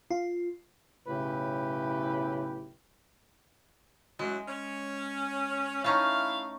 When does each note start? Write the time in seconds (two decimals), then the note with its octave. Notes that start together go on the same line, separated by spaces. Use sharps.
0.11 F4
1.08 B1 A2 C#3 E4 G4 B4
4.19 F#2 A2 G#3 F#4
4.48 C#4
5.84 A3 C#4 D#4 E4 F5